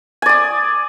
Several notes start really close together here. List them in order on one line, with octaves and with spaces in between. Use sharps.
G#5 D5 D#6